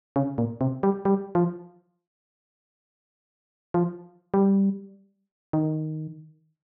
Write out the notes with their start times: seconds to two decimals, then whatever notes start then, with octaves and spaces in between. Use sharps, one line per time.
0.16 C#3
0.38 A#2
0.61 C3
0.83 G3
1.05 G3
1.35 F3
3.74 F3
4.34 G3
5.53 D#3